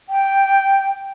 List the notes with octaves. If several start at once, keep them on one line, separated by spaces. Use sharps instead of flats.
G5